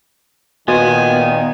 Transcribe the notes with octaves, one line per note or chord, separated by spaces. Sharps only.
A#2 D#3 B3 F#4 B4 D#5 G#5